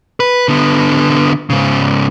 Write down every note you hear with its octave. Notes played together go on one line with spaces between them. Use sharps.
B4
D3 B3
G#2 C#3